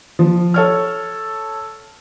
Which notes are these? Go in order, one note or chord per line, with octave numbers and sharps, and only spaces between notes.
F3
A4 C#5 F6